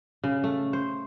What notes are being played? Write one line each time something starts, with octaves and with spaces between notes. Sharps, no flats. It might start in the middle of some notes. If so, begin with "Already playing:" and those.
C#3
A3
C5